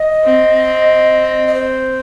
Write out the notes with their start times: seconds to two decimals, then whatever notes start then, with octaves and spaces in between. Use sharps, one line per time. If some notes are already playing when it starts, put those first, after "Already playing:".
Already playing: D#5
0.24 C4
1.47 D#5
1.54 C5